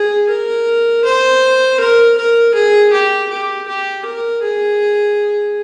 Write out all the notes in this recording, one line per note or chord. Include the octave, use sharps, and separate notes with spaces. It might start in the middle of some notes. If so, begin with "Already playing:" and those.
Already playing: G#4
A#4
C5
A#4
A#4
G#4
G4
G4
G4
A#4
G#4